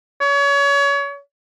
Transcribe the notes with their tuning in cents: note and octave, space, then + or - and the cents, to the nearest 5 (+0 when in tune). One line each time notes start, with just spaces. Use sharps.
C#5 +30